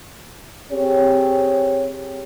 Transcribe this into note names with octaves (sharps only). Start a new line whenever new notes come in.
C4 G4 G#4 C#5